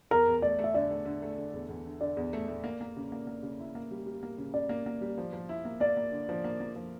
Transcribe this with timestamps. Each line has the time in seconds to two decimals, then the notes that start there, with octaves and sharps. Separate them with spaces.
0.11 E2 A#4
0.27 E2
0.42 A3 D5
0.59 A3
0.64 E5
0.74 D3 D5
0.91 A3
1.05 D3
1.22 A3
1.38 D3
1.54 E2
1.69 E2
1.86 D3
2.01 D3 D5
2.17 E2
2.33 A3
2.48 A3
2.64 A#3
2.81 A#3
2.96 C#3
3.12 A#3
3.27 A#3
3.43 C#3
3.59 E4
3.75 A#3
3.91 G3
4.06 G3
4.23 A#3
4.38 C#3
4.53 C#3 D5
4.69 A#3
4.86 A#3
5.01 G3
5.18 F3
5.33 F3
5.49 E4
5.65 A#3
5.80 A#3 D5
5.97 A#3
6.12 D3
6.29 F3
6.44 A#3
6.60 A#3
6.76 F3